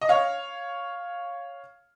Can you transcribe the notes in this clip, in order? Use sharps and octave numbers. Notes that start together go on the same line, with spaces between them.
D#5
C#5 F5